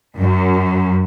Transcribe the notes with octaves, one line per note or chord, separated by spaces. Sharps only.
F#2